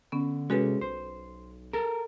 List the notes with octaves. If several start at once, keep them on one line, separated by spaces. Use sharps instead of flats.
D3 B3 C#4
C3 G#3 C#4 F#4 A4 B4
B1 C5
A4 A#4